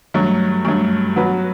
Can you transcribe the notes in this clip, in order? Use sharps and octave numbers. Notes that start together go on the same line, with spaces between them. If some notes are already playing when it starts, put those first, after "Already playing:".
G2 F#3 A3
G2 F#3 A3
F#3 B3 F#4 B4